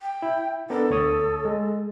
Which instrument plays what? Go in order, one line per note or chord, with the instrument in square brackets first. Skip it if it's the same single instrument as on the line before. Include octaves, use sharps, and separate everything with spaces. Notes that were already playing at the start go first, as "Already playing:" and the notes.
[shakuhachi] G5
[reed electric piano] E4
[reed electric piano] B3 D4 A#4 [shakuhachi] A4
[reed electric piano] D2 C#5 D#6
G#3